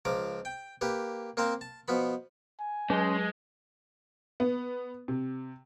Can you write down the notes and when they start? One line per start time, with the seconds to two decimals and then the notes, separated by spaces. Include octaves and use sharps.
0.05 C#2 F3 A#5 D6
0.45 G5
0.81 A#3 G4 B4
1.37 A#3 C4 A#4 C5 F5
1.61 A5
1.88 B2 F3 B3 B5
2.59 G#5
2.90 F#3 G#3 C#4 C6
4.40 B3
5.08 C3